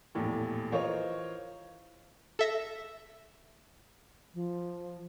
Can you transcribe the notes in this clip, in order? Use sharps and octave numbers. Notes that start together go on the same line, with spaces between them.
A#1 E2 A2 G4
E3 F4 A#4 C5 C#5 D#5
A4 E5 A#6
F3